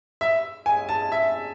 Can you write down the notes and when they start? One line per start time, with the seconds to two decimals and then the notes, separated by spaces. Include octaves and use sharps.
0.21 E5
0.66 G#5
0.89 A5
1.12 E5